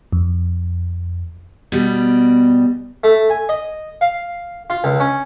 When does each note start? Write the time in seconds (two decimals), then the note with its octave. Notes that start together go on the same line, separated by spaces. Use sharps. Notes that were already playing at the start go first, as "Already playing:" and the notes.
0.13 F2
1.72 B2 G3
3.04 A3
3.30 G#5
3.49 D#5
4.01 F5
4.70 F4
4.84 C#2
5.00 C#4